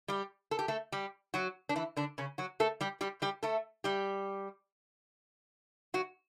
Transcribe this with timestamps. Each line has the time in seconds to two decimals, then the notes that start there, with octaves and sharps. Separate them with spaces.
0.08 G3 G4
0.51 A4
0.59 G4
0.68 A3 A4
0.92 G3 G4
1.34 F#3 F#4
1.69 D4
1.76 E3 E4
1.97 D3 D4
2.18 C#3 C#4
2.38 F#3 F#4
2.60 A3 A4
2.81 G3 G4
3.01 G3 G4
3.22 G3 G4
3.43 A3 A4
3.84 G3 G4
5.94 F#3 F#4